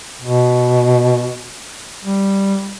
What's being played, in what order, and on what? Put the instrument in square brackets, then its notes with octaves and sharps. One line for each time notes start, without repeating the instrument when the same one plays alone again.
[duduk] B2
G3